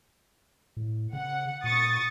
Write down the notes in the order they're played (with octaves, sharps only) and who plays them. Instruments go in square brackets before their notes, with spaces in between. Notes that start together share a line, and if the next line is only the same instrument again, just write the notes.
[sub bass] A2
[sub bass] C#3 [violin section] F#5
[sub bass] A#2 [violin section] C#6 D#6 A6